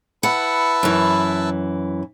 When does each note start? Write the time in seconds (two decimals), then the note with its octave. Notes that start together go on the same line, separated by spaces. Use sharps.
0.23 E4 B4 F#5 A5
0.83 F#2 E3